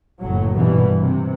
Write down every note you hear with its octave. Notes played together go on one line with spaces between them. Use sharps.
F#1 A2 F#3
G#1 G2 B2 E3 G3
C3